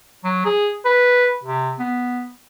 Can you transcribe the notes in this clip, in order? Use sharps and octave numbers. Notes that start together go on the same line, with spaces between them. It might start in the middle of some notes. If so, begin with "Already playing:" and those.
F#3
G#4
B4
C3
B3